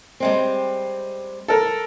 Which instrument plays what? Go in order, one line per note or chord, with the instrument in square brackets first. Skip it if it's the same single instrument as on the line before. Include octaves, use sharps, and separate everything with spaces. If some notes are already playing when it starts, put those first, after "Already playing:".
[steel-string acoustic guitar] G3 G#3 C4
[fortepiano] A4 A#4